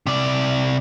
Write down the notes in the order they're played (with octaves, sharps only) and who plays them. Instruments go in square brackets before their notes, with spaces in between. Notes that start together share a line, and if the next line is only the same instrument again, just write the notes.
[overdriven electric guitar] C3 D5